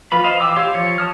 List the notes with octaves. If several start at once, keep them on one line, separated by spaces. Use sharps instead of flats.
F3 F4 B4 B5
C5 D#5 F5
E3 G5 D6 E6
G4 C#5 F5 C6 E6
F3 C#5
A5 D#6 F6